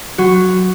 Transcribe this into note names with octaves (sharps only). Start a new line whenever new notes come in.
F#3 F#4